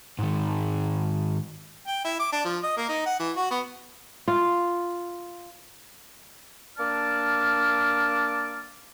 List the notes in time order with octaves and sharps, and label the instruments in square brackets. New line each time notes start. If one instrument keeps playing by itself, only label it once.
[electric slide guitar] G#2 D#3
[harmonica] G5
E4
D6
D4
F3
D#5
A#3
D#4
F#5
E3
F#4
B3
[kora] F4
[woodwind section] A#3 D4 D5 A5 D6 F6